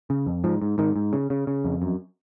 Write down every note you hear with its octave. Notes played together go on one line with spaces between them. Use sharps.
C#3
F2
G#2 F3
G#2
G#2 D#3
G#2
C#3
C#3
C#3
F2
F#2